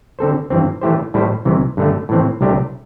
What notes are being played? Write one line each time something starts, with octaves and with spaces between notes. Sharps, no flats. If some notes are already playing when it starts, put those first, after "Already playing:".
D3 C4 A4 C5
G2 E3 C4
E3 A3 E4 G4 C5
A2 G3 E4 C5
C2 C3 E3
G2 D3 A3
A2 E3 C4
C2 C3 A3 D4 G4